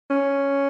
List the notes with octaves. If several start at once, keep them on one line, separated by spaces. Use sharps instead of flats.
C#4